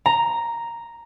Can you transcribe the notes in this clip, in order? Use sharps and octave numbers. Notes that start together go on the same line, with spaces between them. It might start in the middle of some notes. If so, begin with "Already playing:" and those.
A#5